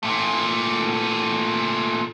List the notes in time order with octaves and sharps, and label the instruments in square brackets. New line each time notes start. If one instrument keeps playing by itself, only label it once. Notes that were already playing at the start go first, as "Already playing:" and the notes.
[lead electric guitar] A#2 A3